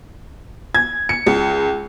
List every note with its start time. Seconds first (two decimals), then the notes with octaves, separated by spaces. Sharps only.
0.75 G#6
1.09 C#7
1.27 C#2